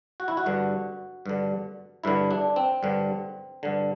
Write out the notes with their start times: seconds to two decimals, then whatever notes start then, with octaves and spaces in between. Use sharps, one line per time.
0.20 F#4
0.28 E4
0.37 F#4
0.46 G2 D3
1.26 G2 D3
2.04 G2 D3 E4
2.31 D4
2.56 C4
2.83 G2 D3
3.63 G2 D3